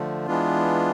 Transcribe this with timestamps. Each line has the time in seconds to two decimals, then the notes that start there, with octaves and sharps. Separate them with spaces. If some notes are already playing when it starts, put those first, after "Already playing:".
Already playing: D3 F3 A3
0.26 E3 G#3 B3 D4 F4